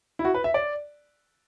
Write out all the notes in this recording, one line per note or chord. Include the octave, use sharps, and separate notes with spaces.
E4
F#4
B4
E5
D5